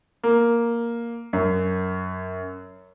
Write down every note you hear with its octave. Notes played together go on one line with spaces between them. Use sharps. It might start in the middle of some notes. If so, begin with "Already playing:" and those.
A#3
F#2